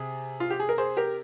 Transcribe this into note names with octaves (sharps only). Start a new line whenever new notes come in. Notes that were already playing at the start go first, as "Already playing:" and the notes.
Already playing: C3 G#4
F4
G4
G#4
A#4
G#4 C5
G4 A#4